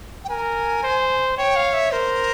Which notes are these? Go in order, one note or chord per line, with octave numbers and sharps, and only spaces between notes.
G5
A#4 G#5
C5
C#5 G5
F5
E5
A#4 C5